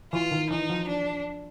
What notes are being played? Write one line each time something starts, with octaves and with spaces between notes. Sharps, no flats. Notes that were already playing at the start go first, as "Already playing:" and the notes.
E3 F4
D#3
E3 D#4
F3
D4